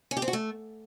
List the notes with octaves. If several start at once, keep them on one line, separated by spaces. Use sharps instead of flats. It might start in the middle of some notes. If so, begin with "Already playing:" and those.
C#4
G4
C4
F#4
A3